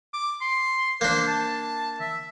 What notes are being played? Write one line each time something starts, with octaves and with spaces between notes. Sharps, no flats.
D6
C6
A#3 D4 C5
A5
E5